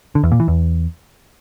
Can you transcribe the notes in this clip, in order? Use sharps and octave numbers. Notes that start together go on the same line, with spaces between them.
D3
E2
A#2
E3
E2